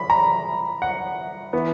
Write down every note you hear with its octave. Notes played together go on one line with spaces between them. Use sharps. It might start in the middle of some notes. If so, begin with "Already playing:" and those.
Already playing: B5
A#5
F#5
E3 B3